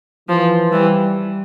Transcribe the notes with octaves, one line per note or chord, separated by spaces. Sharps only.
E3 F3
E3 G3